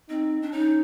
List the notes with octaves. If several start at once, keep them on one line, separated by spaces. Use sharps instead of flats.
C4 D#4
D4
C#4 D#4